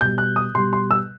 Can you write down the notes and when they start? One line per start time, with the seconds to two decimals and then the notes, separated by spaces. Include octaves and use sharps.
0.01 B2 G6
0.05 G3
0.18 F#6
0.36 D#6
0.54 B2 G3 C6
0.73 C6
0.91 E6